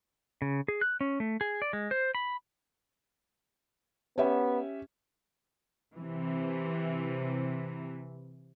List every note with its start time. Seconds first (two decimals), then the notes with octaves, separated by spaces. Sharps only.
0.42 C#3
0.68 G#4
0.81 F#6
1.01 C#4
1.20 A3
1.41 G#4
1.62 D5
1.73 G#3
1.91 C5
2.15 B5
4.18 B3 C#4 G4 E5
5.95 C3 E3